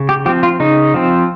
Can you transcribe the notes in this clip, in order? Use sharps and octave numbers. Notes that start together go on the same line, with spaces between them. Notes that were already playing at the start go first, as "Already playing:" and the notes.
Already playing: C#3
G4
F3 C4 G4
F4
C#3 D#4
F3 C4